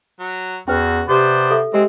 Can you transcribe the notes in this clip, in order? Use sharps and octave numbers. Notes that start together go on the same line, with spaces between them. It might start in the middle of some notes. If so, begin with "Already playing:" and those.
F#3
E2 C#4 F#4 B4
C3 B3 G4 C5 D5
A4 E5
G#3 C4 G4